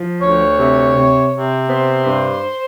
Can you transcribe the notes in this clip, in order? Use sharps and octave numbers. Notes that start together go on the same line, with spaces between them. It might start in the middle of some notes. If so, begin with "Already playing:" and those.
Already playing: F3
D2 C#5
C3
C3
C3
B3 C5
G2